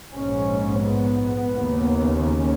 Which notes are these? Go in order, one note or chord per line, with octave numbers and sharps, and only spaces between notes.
A#1 G#2 C#4
B3
D#2 C#3
C#4